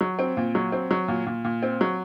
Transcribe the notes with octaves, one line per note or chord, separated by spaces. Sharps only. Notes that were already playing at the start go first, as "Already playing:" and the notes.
F#3
C4
A#2
F#3
C4
F#3
A#2
A#2
A#2
C4
F#3